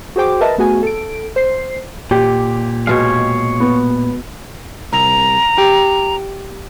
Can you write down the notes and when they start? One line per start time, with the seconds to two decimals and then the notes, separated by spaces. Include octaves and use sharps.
0.16 F#4 G#4 C5 G5 D6
0.41 A#4 B4 D#5 E5 A5
0.58 A3 B3 F#4 G#4 G#5
0.83 A4 D7
1.36 C5 C7
2.11 A#2 G4
2.87 B2 G#3 C#5 F5
3.60 B3
4.93 C2 A#5
5.58 G4